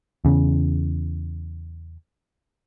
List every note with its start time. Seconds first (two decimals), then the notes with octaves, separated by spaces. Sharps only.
0.25 E2 C#3